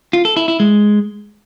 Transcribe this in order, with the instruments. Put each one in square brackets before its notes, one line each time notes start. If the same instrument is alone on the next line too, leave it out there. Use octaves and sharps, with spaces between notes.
[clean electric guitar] F4
A4
E4
E4
G#3